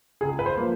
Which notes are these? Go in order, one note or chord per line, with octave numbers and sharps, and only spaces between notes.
C#2 G#4
B4
C5
F3 A#3